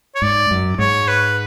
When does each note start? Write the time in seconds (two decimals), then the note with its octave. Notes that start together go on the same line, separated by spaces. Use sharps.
0.15 C#5
0.22 G#2 D5
0.51 F#2
0.79 G#2 C#5
1.08 B4